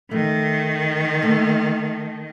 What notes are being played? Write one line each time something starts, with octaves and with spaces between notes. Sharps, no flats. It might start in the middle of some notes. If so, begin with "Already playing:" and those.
D#3 A3
A3 A#3